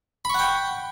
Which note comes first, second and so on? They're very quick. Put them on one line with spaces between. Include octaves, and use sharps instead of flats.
B5 C#6 F#5 G5